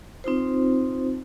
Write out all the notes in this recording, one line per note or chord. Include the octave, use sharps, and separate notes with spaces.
C4 D#4 F4 C5